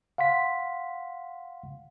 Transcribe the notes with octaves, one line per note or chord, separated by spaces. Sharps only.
F5 F#5 C6 B6